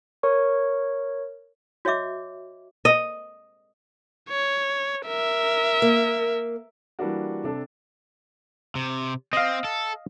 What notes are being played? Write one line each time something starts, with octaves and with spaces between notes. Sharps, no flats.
A#4 C#5 C#6
F#4 C#5 D#5 E5 D6
D#5
C#5
A#4 E5
A#3
E3 G3 A#3 D4 F#4
C3 D4 A4
C3
C4 D#5 F5
A4